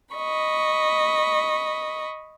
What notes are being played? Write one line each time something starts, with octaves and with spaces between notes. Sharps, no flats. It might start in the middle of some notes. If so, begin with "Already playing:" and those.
D#5 B5 C#6